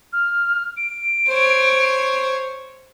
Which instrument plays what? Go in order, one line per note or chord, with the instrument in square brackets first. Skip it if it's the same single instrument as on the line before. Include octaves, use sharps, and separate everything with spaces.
[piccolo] F6
D7
[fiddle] C5 C#5